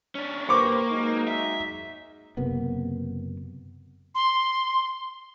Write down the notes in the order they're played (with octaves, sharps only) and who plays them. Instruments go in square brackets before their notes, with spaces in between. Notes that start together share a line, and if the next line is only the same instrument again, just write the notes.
[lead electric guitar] C#4 D4
[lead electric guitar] A#3 [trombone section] G4 B4 C5 [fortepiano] C#6 D6
[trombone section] F#3 G#3 D#4
[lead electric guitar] E5
[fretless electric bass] F#1 C3 A#3 B3
[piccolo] C6